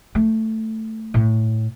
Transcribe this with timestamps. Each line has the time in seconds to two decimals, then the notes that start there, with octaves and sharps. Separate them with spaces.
0.15 A3
1.14 A2